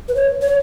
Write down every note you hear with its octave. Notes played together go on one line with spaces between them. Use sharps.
B4
C#5
C#5